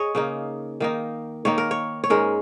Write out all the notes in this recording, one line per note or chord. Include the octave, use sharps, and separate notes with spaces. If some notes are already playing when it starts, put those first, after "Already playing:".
Already playing: G#4 C#5 D#5
C#3 A#3 D#4
D#3 A#3 D#4
D#3 A#3 D#4 C#5
A#4
C#5
C#5
G#2 G#3 C#4 A#4